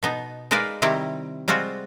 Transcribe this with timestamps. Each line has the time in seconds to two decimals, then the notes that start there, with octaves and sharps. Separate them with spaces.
0.03 B2 B3 D#4
0.51 G#3 D#4 A#4 B4 D5 F5
0.82 C3 D#3 G3 C4 E4 G4
1.48 G3 G#3 C4 F4 F#4